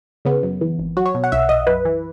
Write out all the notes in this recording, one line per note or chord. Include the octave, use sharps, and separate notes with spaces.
C#3 B3
F#2
E3
G#1
F#3 F#4
C#5
B2
F#5
B1 E5
B1 D#5
F#2 B4
E3